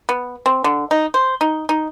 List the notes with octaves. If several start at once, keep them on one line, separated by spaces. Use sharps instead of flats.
B3
C4
D3
D#4
C5
D#4
D#4